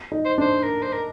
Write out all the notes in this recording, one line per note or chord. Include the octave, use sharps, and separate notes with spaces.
D#4
C5
D4 C5
A#4
C5
A#4